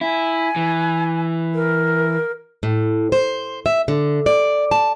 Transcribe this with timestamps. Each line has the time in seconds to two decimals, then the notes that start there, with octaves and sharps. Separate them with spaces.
0.01 E4 G#5
0.56 E3
1.54 A#4
2.63 A2
3.12 C5
3.66 E5
3.88 D3
4.26 D5
4.71 A5